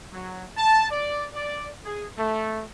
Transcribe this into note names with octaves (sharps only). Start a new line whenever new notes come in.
F#3
A5
D5
D5
G#4
A3